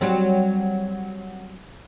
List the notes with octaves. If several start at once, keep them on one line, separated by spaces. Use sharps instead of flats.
F#3 G3 C4